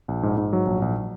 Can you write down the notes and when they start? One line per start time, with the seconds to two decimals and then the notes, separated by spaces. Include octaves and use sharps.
0.08 A#1
0.23 G#2
0.38 G#2
0.53 F#3
0.67 A#1
0.82 A#1